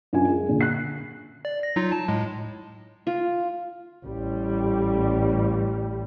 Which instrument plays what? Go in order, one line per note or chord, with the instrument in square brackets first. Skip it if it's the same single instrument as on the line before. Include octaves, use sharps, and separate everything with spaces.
[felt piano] F#2 D4 F4 G#5
G#3
A#2 D3
F#6 C7
[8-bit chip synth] D5
A#6
F#3 D#4 F4
A5
A2 G#3
[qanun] F4
[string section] A1 G3